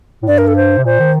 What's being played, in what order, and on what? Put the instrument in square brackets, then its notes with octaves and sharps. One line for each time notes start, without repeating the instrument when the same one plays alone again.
[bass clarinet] A2
[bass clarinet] G2 [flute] D5
[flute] A#4
A4
C5
[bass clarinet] C3
[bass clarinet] A#2 [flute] C5
[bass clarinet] D#3